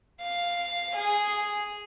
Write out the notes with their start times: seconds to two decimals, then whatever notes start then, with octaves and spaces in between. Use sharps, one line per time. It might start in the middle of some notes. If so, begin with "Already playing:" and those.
0.21 F5
0.95 G#4